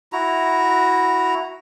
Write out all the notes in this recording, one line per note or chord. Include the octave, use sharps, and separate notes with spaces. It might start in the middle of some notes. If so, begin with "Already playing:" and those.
E4 F#4 A#5